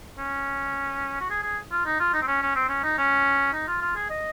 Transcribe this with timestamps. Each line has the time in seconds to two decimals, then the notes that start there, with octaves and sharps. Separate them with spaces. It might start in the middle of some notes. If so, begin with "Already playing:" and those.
0.18 C#4
1.21 F#4
1.30 G#4
1.43 G#4
1.72 F4
1.86 D#4
2.00 F4
2.14 D#4
2.22 C4
2.28 C#4
2.42 C#4
2.55 C4
2.69 C#4
2.83 D#4
2.98 C#4
3.53 D#4
3.68 F4
3.81 F4
3.96 G#4
4.10 D#5